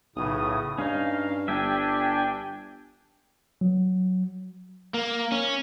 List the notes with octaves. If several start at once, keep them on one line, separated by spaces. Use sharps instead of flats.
B1 A2 C#3 D#6
G2 C#4 D#4 F5
G1 D4 G4 E5 G5 G#5
F#3
A#3
C#4